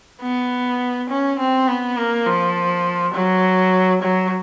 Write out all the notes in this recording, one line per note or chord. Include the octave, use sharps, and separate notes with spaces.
B3
C#4
C4
B3
A#3
F3
F#3
F#3